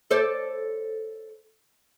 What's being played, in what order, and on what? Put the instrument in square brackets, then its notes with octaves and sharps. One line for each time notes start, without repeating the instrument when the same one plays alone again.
[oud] A4 C5 D5